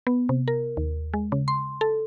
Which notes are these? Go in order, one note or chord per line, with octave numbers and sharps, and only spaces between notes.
B3
C3
A#4
D#2
G#3
C#3
C6
A4